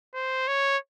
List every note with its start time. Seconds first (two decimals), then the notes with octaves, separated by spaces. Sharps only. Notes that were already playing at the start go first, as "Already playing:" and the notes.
0.15 C5
0.48 C#5